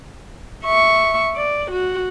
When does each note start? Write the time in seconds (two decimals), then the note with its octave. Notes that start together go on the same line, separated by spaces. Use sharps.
0.64 E5 C#6
1.36 D5
1.71 F#4